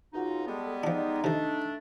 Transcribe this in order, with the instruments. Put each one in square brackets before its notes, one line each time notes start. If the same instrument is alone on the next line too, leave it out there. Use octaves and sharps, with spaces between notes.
[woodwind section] C#2 D#4 [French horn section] F4 F#4
[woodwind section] G3 G#3 B3 [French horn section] A4
[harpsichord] F3 D4 [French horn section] D#4
[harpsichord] C3 D#3 [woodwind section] A3 D4